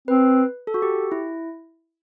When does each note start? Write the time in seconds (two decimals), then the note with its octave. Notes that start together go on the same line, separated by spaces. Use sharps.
0.08 C4 B4
0.67 A4
0.74 F#4
0.82 G4
1.12 E4